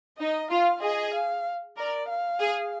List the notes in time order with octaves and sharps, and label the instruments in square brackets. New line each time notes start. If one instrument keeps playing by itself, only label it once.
[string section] D#4 [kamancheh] D#5
[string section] F4 [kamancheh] F5
[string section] G#4 [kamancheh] D#5
[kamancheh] F5
[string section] A#4 [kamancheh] D5
[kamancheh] F5
[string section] G#4